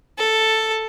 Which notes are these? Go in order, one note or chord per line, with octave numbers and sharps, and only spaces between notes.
A4